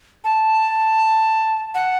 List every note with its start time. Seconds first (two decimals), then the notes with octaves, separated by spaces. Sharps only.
0.24 A5
1.75 F#5